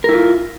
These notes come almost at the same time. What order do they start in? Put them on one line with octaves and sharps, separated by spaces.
A#4 E4 F4